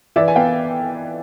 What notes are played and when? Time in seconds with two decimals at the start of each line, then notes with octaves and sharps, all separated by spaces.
0.16 E3 D5 E5
0.28 G#5
0.35 B3 F5 G5